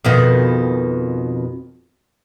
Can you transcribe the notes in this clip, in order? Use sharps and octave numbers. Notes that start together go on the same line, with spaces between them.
F2 B2 D#3